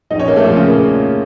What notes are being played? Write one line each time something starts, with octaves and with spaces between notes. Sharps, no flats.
A#1 A#2 D#4 D#5
C#4 C#5
A#3 A#4
A3 A4
F3 F4
C#3 C#4
A#3